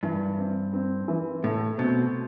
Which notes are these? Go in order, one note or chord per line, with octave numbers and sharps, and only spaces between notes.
G2 E3
C4
C4
E3
A2 A3
B2 C4